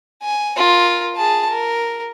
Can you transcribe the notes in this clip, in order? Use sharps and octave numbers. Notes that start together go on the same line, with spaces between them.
G#5
F4 A#4
G#4 A5
A#4